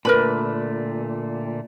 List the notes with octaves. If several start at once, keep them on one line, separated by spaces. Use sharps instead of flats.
A#2 D3 A3 A#4 B4 B5